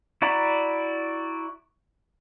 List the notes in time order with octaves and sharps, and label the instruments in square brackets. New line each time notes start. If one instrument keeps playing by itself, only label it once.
[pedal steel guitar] E4 F#4 D5 A#5 B5